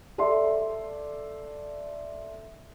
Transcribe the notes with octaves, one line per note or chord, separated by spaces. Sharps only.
A4 D5 E5 C6